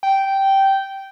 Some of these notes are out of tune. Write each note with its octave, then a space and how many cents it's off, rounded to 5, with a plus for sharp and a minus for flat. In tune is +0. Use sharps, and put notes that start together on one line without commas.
G5 -10